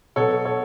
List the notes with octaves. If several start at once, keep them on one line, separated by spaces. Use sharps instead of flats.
B2 F#3 B3 A4 C#5
A4 C#5